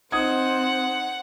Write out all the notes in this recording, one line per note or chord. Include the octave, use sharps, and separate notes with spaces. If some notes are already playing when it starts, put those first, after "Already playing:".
C4 D#4 C5 F#5 D#6 G#6